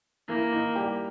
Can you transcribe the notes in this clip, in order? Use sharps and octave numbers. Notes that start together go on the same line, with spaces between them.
E3 A#3 E4
D#3 D#4
G3 G4